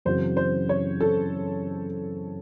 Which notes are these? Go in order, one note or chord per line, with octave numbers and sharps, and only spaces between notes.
F#2 C#3 E3 C4 F#4 C5
C5
C#5
A4